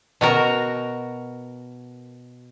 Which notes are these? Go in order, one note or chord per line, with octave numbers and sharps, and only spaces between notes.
B2 F#4 A#4